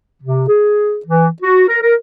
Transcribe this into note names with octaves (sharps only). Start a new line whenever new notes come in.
C3
G#4
E3
F#4
A#4
A#4